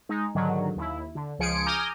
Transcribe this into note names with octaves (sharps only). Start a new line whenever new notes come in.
G#3 D#4
G#2 D3 D#3 F#3
D#2 E4
D3
C#2 F3 G#4 C#7 D7
G#5 A#5 D6 D#6 F6 G6